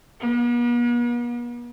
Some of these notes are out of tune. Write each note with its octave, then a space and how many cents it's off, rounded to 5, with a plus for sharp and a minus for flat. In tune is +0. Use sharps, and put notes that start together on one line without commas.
B3 -45